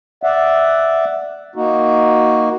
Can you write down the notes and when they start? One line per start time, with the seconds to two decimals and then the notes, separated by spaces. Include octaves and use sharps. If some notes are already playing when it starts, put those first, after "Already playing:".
0.23 D5 E5 F#5
1.56 A#3 D#4 F#4